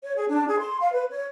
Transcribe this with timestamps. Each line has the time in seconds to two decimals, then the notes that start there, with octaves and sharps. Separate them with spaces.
0.03 C#5
0.16 G#4
0.29 D4
0.47 G#4
0.59 C6
0.80 F5
0.93 B4
1.10 C#5